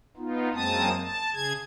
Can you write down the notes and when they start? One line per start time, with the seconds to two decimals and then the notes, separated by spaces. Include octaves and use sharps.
0.17 B3 D#4 F4
0.53 F#2 G#3 A#3 C4 A5 D#6
1.02 A5
1.34 C#3 G#4 G#6